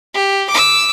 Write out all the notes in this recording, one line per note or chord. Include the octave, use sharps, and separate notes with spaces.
G4
D6 E6